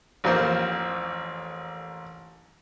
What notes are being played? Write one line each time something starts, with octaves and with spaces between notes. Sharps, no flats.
A1 F2 A#2 A#3 C5